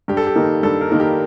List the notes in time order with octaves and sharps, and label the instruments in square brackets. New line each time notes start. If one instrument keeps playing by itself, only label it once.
[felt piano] G2 [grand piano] G4
[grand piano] A4
G4
[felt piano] D#3 A#3 D#4
[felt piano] G2 [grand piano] A4
[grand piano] A#4
[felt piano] D#3 A#3 D#4
[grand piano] G4